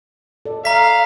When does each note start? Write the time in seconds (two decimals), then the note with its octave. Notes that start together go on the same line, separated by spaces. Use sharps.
0.45 A4 D5 D#5
0.65 E5 F5 A#5 B6